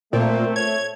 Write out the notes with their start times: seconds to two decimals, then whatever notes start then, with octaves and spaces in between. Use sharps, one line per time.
0.13 A#2 A3 C4
0.56 C#5 G#6